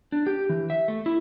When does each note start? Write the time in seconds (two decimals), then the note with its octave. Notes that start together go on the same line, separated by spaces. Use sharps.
0.12 D4
0.27 G4
0.49 E3
0.70 E5
0.88 A3
1.06 E4